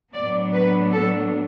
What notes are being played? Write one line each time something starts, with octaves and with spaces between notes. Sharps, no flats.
A2 F#3 B3 D4 D5
B4
A4